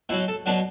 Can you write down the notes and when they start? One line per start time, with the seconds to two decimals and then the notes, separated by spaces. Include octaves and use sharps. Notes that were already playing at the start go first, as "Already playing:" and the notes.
0.09 B2 E4
0.12 F#3
0.28 A4
0.46 B2 F#3 D4